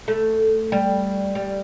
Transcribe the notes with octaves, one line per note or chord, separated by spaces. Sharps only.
A3
G3
G3